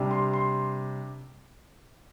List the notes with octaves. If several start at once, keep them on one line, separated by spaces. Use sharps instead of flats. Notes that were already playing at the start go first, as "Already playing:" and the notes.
Already playing: C3 G3 D4
C6
C6